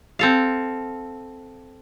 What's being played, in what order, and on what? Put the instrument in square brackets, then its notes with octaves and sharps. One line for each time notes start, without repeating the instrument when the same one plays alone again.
[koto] C4 A4 F5